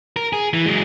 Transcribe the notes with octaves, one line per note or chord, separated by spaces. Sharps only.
A#4
G#4
E3
F#3 G#3